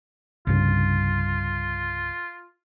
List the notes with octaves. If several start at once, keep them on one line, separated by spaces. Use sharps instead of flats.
C2 G2 C#3 F4